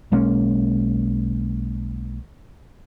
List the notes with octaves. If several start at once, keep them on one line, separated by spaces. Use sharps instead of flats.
B1 G#3 A#3 C#4